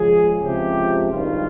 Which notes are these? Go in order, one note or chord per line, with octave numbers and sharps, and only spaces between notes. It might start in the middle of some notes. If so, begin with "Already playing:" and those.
Already playing: C#2 C#3 F3 G#4
C#2 C3 F3 G4
G#1 G2 D#3 F4